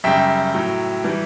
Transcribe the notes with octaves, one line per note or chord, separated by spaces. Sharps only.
F#2 C#3 G3 E5 G5
A2 F#3
E3 G3